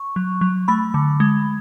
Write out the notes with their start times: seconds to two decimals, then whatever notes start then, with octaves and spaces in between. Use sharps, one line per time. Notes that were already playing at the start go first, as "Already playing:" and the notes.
Already playing: C#6
0.16 F#3
0.41 F#3
0.68 A3 B5
0.94 D3
1.20 G#3